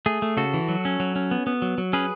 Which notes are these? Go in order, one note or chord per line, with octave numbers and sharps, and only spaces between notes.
A3 G#4
A3
C#3 F#4 A4
E3
F#3
C#4
F#3
C#4
B3
B3
F#3
F#3
C#4 G#4 B4